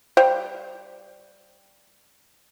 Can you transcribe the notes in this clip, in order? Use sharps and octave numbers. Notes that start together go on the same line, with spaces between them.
G3 C5 F5 G5